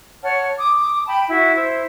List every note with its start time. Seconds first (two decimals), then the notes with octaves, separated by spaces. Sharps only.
0.23 C#5 F#5 A5 F6
0.59 D6 D#6
1.07 G5 A5 B5
1.28 E4 F#4
1.55 E4 C5